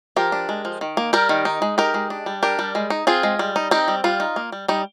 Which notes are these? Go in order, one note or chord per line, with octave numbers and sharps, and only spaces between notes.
F3 G4 A#4
D4
G#3
F3
D#3
A#3
G3 G4 A#4
D#3
D#4
G#3
D#4 G4 A#4
G#3
D4
G3
D4 G4 A#4
G3
G#3
D#4
C4 F4 G#4
G#3
G3
D#4
C4 D#4 G4
G3
G3 F4
D#4
A#3
G3
G3 D#4